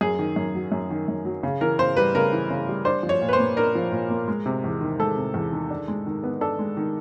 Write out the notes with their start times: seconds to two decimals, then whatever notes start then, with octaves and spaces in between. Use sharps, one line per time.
0.01 F#2 G#4
0.19 D#3
0.36 F#2
0.55 F#3
0.72 F#2
0.91 D#3
1.08 F#2
1.25 F#3
1.43 C#3
1.61 E3 A#4
1.79 C#3 C5
1.97 G3 B4
2.14 C#3 A#4
2.33 E3
2.50 C#3
2.68 G3
2.85 D4 C5
3.03 F3
3.09 C#5
3.21 A#2
3.28 B4
3.33 C5
3.39 A#3
3.57 D4 A#4
3.75 F3
3.92 A#2
4.10 A#3
4.28 G#3
4.46 C3
4.64 E2
4.81 D#3
4.99 G#3 A4
5.17 C3
5.34 E2
5.52 D#3
5.70 D4
5.88 G#3
6.06 D#3
6.24 B3
6.41 D4 A4
6.59 G#3
6.77 D#3